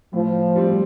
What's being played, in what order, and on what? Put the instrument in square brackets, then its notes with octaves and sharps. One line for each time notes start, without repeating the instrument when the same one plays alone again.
[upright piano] A2 [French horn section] F3
[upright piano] G3 C4